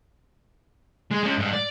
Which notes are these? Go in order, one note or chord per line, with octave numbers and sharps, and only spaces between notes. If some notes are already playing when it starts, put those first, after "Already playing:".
G#3
G#3 C#4
G#2 G3
D5